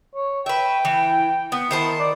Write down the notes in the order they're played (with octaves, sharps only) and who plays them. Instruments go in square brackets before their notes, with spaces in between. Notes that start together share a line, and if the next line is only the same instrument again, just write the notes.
[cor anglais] C#5
[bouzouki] B4 E5 [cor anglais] G5
[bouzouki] E3
B3
[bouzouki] D#3 C5 A5 [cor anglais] E4
[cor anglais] D5